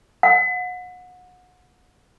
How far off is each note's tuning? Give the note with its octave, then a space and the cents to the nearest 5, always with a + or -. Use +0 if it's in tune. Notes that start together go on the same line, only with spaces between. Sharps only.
F#5 -30